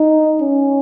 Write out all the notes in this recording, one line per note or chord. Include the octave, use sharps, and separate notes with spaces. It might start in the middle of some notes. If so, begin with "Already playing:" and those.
Already playing: D#4
C#4